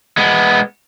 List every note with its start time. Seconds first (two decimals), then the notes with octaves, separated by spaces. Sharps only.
0.17 G#3 B3